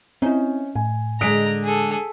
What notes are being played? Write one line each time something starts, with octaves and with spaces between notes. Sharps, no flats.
C4 C#4 D#4 E4
A2 G#5
D3 G#3 A#5 D#6 B6 D7
G#4 A4